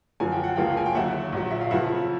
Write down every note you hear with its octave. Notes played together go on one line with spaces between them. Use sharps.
F#2 D3 F3 G#5
G5
F#5
C#2 C#3 F3 A#3 F5 G5
G#5
G5
D#2 D3 F#3 E5 F#5
A#1 A#2 F#3
E5
F5
F2 C#3 F3 E5 F#5